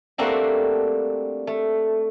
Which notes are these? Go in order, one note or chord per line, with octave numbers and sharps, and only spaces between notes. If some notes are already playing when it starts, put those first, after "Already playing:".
G3 A3 A#3 C4 D4 F#4
A3